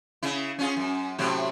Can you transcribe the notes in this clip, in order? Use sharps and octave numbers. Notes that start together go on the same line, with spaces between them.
C#3 E4
C#4 F4 G#4
F#2
A2 C3 F#3